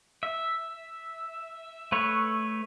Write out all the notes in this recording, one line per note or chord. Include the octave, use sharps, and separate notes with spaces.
E5
A3 B4 C#5